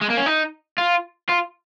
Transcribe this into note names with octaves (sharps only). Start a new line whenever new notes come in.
G#3
A#3
C#4
D#4
F4
F4